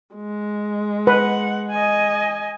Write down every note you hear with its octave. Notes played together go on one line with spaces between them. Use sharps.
G#3
B4 F#5
D#5 G#5